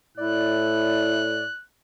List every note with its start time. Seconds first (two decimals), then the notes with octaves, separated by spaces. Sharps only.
0.17 A2 E4 D5 F#6